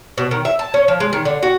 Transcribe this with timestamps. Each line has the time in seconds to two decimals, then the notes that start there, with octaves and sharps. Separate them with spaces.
0.18 B2
0.31 D#3
0.45 E5
0.59 A5
0.74 C#4
0.88 F3
1.00 G#3
1.13 D#3
1.25 D3
1.43 F#4